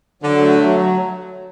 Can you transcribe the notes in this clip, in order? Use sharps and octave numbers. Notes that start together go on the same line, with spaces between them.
D3 F#3
A3
F#3